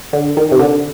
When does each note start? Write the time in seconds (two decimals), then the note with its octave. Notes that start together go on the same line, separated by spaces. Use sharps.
0.13 D3
0.37 D#3
0.52 C3
0.59 D3